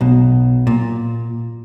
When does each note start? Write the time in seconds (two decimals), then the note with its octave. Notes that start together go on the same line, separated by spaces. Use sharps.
0.01 B1 B2
0.67 A#2